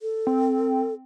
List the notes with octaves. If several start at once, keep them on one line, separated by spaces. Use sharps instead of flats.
A4
C4